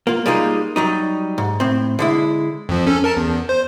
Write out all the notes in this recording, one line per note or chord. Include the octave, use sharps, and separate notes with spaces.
A#3 F4
G3 G#3 A#3 D#4 F4
F#3 G3 D#4
G#2
A2 C4
D3 G#3 E4
F2 F3
C#4 A4
A#4 A5
E2
C5